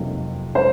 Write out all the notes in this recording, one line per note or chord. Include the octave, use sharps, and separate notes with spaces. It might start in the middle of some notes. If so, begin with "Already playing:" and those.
Already playing: F2 C3 F#3 A#3 D#4
C5